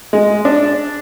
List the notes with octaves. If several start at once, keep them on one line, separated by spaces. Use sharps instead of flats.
G#3
D4